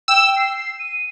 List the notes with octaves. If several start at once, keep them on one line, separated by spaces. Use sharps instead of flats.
G5 E6
C7
D#7